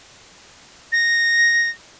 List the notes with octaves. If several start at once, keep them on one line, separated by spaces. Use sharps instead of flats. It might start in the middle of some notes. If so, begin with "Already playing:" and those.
A#6